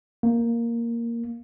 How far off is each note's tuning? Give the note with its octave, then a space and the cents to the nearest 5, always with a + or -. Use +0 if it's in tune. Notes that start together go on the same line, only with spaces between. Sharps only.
A#3 +0